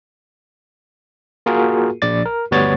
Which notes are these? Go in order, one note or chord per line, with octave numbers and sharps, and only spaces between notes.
A#3 F4 F#4 G#4 A#4
A#1 D5 A6
A#4
G1 D2 G3 B3 C#5 A6